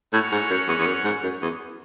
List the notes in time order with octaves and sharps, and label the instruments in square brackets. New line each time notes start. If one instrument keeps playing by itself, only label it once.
[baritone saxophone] A2 [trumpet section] C#4 F#4 C#5 F#5
[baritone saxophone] G#2
F#2
E2
E2
F#2
G#2
F#2
E2